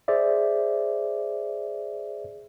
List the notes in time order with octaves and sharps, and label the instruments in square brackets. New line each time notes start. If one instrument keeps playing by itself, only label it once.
[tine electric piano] G#4 C5 D5 E5